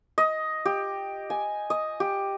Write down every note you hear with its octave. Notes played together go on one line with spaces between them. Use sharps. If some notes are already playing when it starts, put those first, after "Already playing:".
D#5
G4
G#5
D#5
G4